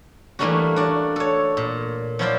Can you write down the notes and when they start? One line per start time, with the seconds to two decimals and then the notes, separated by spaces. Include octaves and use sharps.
0.39 E3 G3 A3 A#3 D4 F#4
0.76 D4 F#4 D5
1.16 A4 C#5
1.57 A#2
2.19 F3 F#3 E4 F4 C5 D5